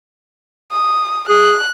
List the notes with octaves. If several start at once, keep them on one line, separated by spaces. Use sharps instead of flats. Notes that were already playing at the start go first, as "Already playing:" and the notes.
D#6
G#4 F#6